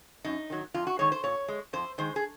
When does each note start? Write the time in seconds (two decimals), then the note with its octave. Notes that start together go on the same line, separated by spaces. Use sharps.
0.24 F#2 D#4
0.50 D#3 F#3
0.74 F2 F4
0.87 F#4
0.99 D#3 G#3 C#5
1.12 C5
1.23 A#2 C#5
1.48 G#3
1.73 F2 C5
1.98 D#3 G#3 C5
2.16 G#4